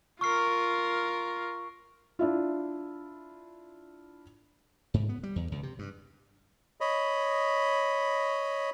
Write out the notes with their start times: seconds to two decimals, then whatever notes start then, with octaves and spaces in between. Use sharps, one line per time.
0.21 F4 A#4 C#6 F6 C7
2.19 D4 E4 F4
4.94 G#2
5.09 B3
5.23 G3
5.36 E2
5.52 C#2
5.63 C3
5.79 G2
6.81 C#5 D#5 B5